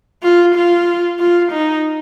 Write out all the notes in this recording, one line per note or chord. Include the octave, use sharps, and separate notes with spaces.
F4
F4
F4
D#4